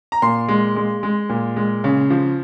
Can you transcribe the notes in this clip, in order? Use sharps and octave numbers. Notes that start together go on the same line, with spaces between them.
A#5
A#2 C6
G#3
G#3
G#3
A#2
G#3
C#3
F3